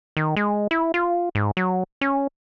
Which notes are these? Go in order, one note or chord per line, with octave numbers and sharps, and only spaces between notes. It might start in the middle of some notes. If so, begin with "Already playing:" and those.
D#3
G#3
E4
F4
G#2
F#3
C#4